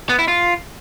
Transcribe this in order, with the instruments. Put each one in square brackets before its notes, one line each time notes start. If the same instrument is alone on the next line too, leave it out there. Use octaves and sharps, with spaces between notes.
[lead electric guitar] B3
E4
F4